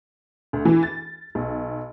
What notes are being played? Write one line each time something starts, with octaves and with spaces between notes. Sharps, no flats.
D2
E3
A6
B1